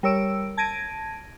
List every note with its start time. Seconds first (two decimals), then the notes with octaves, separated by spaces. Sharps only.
0.03 G3 A#4 C#5 E6 D7
0.57 A5 G#6 A#6 D7 D#7